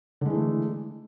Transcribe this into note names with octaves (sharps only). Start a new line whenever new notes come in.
D3 E3 G#3 A3